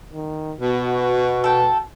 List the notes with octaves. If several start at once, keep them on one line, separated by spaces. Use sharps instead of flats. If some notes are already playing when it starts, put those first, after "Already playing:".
D#3
B2 F#4
A4 G5